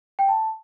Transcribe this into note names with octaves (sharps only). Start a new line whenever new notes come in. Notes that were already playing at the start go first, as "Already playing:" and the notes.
G5
A5